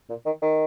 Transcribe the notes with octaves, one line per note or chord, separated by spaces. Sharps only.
A#2
D#3
D#3